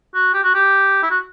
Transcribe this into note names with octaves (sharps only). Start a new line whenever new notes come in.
F#4
G4
F#4
G4
E4
F#4